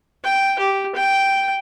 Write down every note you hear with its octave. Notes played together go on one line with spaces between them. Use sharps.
G5
G4
G5